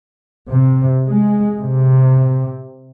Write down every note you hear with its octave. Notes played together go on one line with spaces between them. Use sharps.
C3
G#3
C3